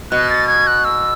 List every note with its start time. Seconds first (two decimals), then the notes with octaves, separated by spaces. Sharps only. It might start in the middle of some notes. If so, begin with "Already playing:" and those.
0.11 B2 F#6
0.30 A6
0.48 G#6
0.67 F#6
0.85 E6